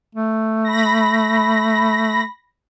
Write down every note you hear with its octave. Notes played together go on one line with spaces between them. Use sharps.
A3
B5 A#6